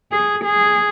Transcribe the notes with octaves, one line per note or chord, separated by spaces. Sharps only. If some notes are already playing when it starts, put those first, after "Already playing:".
G#4
G#4